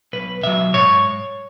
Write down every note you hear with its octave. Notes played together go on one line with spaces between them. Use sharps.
B1 B4
B2 F#3 E5
G#2 C#5